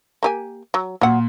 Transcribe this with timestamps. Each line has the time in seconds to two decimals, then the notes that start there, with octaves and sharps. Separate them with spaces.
0.23 A#3 G4 G#5
0.74 F#3
1.01 A#2 F#3 F#5